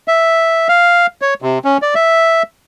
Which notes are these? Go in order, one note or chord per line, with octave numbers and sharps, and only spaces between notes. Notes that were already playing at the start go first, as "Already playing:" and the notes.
E5
F5
C#5
C3
C#4
D5
E5